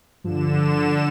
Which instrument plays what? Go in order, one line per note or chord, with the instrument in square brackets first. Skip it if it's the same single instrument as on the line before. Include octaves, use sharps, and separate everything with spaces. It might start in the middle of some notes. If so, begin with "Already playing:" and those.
[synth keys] G2 F3 [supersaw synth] D3 E7